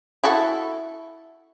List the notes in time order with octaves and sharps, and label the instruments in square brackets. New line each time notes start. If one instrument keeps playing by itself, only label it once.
[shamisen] E4 F#4 A4